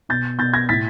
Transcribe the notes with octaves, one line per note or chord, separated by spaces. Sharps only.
B2 G6 A6
B2 G6 A6
G#6 A#6
A2 A6 B6